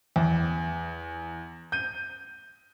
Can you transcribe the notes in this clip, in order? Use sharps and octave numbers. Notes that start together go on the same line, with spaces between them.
E2
G6 D#7